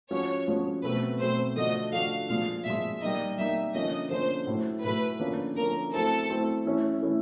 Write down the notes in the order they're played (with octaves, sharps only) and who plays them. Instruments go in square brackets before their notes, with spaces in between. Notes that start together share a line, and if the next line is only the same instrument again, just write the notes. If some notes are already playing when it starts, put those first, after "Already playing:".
[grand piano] F3 G#3 C#4 F#4 [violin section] C#5
[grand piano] F3 G#3 C#4 F#4
[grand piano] B2 F#3 A3 C4 [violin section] B4
[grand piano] B2 F#3 A3 C4 [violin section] C5
[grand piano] D3 F3 A3 D4 F#4 [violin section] D#5
[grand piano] D3 F3 A3 D4 F#4 [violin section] F5
[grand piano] A#2 F3 G#3 [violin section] F5
[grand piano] A#2 F3 G#3 [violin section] E5
[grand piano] G3 A#3 D#4 [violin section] D#5
[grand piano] G3 A#3 D#4 [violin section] E5
[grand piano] D3 F3 A#3 C#4 [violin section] D#5
[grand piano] D3 F3 A#3 C#4 [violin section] C5
[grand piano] A2 F#3 A3
[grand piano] A2 F#3 A3 [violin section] B4
[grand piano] D3 F3 A#3 C#4
[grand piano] D3 F3 A#3 C#4 [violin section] A#4
[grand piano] F#3 A3 C4 E4 [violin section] A4
[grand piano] F#3 A3 C4 E4
E3 A3 C#4 E4
E3 A3 C#4 E4